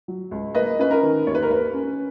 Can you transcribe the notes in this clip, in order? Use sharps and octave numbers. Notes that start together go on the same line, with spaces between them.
F#3
C#2
A#3 B4 D#5
C#4 B4
A#4
D#3
D#2 C#5
B4
A#4
A#3 B4
C#4